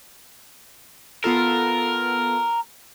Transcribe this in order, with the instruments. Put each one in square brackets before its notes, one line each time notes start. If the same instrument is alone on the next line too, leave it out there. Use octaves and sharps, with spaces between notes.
[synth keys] B3 F4 A4 [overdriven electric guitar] A#4